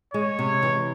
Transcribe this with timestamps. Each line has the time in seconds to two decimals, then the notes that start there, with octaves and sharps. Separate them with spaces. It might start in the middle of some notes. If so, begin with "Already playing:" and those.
0.14 G#3 C#5
0.39 C3
0.63 E3